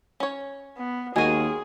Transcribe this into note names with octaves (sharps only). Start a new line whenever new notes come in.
C#4 C#5
B3
D#2 G#3 F#4 G#4 A#4 G#5